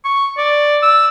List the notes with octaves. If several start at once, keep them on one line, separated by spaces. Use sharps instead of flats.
C#6
D5
E6